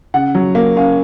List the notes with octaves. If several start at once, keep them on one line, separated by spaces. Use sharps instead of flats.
C#3 F#5
F#3
A#3
C#4 F5